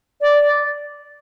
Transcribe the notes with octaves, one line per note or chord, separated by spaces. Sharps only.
D5